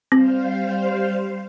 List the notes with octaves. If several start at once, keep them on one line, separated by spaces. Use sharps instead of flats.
G3 C4 C5 F5